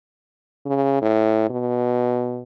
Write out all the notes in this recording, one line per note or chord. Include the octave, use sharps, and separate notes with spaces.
C#3
A2
B2